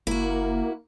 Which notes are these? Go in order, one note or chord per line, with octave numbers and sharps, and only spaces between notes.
F#1 A#3 E4 F#4